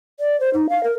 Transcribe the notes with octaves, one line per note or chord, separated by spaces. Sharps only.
D5
C5
D#4
F5
A#4